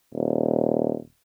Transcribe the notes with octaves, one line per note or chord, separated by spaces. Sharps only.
D#1